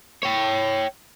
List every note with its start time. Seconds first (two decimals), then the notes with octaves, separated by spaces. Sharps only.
0.23 C#5 G5